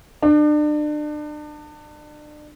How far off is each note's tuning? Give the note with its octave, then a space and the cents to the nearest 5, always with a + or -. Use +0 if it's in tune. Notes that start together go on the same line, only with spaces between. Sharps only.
D4 +35